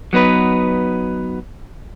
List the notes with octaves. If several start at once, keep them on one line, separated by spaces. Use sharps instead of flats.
F#3 B3 D#4 B4